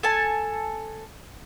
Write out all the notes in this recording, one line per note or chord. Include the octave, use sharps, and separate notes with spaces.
A4 G#5 A5